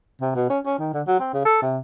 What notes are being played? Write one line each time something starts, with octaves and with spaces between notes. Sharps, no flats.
C3
B2
C#4
C#4
D#3
D3
F#3
C4
C#3
A4
C3